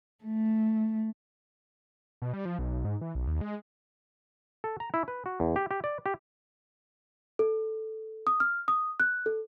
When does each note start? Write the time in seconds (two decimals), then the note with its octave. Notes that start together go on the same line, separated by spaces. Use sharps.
0.24 A3
2.22 B2
2.33 G3
2.45 F3
2.59 B1
2.70 B1
2.85 G#2
3.01 E3
3.15 B1
3.27 D#2
3.41 G#3
4.64 A4
4.80 A#5
4.94 E4
5.08 B4
5.26 F#4
5.40 E2
5.56 G4
5.71 G4
5.84 D5
6.06 G4
7.39 A4
8.27 D#6
8.40 F6
8.68 D#6
9.00 F#6
9.26 A4